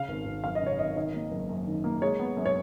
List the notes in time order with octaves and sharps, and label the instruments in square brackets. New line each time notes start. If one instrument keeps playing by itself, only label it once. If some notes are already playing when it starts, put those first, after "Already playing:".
Already playing: [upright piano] C#3 F5
G#1
G#1
F#2 F5
D#5
C#3
C#5
G#1 D#5
D#3 D#5
A#3
F#1
F#2
D#3
A#3
G#3 C#5
B3
F#2
C#5